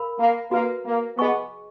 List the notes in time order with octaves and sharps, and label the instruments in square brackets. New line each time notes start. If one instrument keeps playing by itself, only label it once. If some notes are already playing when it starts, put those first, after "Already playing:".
Already playing: [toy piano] A#4 F5 B5
[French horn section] A#3
[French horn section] A#3 [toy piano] F#4 B4 F5
[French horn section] A#3
[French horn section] B3 [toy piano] G#4 D#5 G#5 C#6